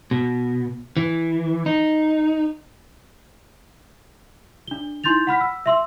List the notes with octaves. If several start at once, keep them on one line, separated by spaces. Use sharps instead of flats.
B2
E3
D#4
D4 G7
D#4 E4 C6 G6 A6 F7
F#5 B5 F6 B6
E6
E5 C6 E6